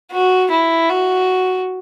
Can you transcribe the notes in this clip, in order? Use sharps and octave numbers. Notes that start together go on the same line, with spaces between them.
F#4
E4
F#4